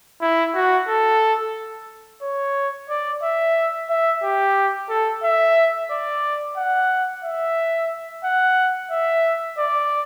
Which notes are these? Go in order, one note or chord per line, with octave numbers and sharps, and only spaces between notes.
E4
F#4
A4
C#5
D5
E5
E5
G4
A4
E5
D5
F#5
E5
F#5
E5
D5